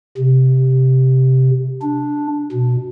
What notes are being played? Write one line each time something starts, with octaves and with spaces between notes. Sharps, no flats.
C3
D4
B2